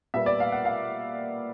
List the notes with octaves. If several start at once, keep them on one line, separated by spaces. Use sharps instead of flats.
A#2 G3 B3 E5
D5
F5
F#5
F5